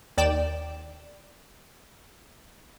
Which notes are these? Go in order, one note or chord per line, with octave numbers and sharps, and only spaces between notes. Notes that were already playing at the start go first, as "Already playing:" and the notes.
D#2 D5 G5 E7